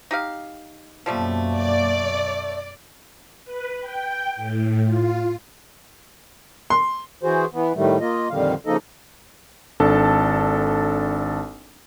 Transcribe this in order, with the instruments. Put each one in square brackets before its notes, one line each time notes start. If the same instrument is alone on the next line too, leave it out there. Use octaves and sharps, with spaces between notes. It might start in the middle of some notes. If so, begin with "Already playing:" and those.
[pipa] D#4 G4 F5
[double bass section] F#2 B2 [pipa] F3 G3 A3 [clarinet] A#3
[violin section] D5
[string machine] B4
G5
A2
F4
[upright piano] C6
[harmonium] E3 F#4 G#4 C5
E3 B3
A2 D#3 G3 A3
A#3 F4 D#5
F2 A#2 D3 D#3 G3 F5
C#3 F3 A#3 D#4 A4 D#5
[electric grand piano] G#1 D4 A4 A5